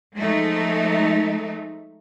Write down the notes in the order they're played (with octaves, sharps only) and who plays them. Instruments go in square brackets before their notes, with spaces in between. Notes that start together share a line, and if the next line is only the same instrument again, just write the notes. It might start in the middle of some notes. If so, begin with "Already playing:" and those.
[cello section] F3 G#3 A3 D#4